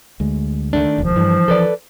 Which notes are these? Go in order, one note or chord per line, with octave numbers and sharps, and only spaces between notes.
D2 G#3
D#3 A3 D4
E1 D#2 F3
G2 E3
A4 B4 D5